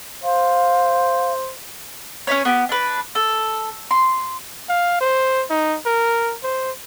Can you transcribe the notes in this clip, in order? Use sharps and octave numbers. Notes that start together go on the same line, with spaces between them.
C5 F5
C#4 D#4 B4 C#5
B3 G4
D4 B4
A4
C6
F5
C5
D#4
A#4
C5